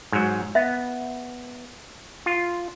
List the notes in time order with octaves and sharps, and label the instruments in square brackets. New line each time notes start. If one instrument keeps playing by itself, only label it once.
[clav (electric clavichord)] G#2 F#3
[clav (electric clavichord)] B3 [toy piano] E5
[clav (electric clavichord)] F4